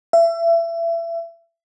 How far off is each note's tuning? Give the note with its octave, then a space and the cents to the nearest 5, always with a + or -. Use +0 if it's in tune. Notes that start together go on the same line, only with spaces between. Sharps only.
E5 +30